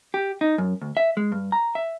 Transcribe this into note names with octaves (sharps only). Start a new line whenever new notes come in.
G4
D#4
F#2
D2
E5
G#3
G2
A#5
E5